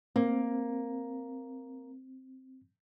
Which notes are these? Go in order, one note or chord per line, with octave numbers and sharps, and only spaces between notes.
A#3 C4